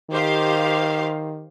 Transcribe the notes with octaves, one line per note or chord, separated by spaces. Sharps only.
D#3 G4 C5 F5